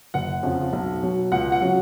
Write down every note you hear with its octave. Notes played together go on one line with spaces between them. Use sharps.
F#1 F#5
F2 C#3 F3
B1
B2 F#3
C#2 F#5
F#5
C#3 F#3